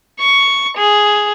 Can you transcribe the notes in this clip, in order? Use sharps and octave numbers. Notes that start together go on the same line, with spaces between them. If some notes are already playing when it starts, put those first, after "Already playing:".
C#6
G#4